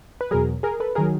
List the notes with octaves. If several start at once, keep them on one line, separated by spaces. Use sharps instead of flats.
B4
E2 B2 F#3 G#4 A#4
G#4 A#4
A4 B4
D#3 F#3 G#4 A#4